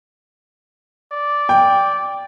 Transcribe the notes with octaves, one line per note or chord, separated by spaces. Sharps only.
D5
G5